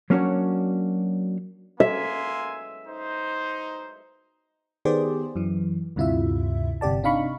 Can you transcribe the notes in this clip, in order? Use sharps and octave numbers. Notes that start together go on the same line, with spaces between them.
F#3 A#3 C#4 D4 F#4 C#5
A#3 E5 G#5 C6
D#4 C5
D#3 B3 G4 G#4 C5 D5
F#2 E3
D2 G2 C3 E4 F4 E5
G1 C3 G4 D5 A5
C3 D4 D#4 F5 B5 C#6